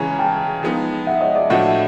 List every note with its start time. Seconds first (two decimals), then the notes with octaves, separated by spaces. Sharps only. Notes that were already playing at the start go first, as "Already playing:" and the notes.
Already playing: C#3 E3 G#3 C#4 G#5 A#5
0.19 G5 A5
0.63 F3 G#3 B3 D#4
1.07 E5 F#5
1.21 C#5 D#5
1.35 D5 E5
1.50 A2 F3 A3 D4 F#4 E5 F#5